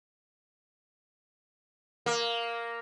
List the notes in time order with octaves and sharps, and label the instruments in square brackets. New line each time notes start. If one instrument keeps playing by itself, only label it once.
[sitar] A#3